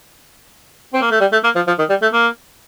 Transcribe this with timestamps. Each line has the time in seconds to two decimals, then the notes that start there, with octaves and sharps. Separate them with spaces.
0.93 C4
1.02 A#3
1.11 A3
1.20 G3
1.32 A3
1.44 A#3
1.55 F3
1.67 F3
1.79 D#3
1.90 G3
2.02 A3
2.13 A#3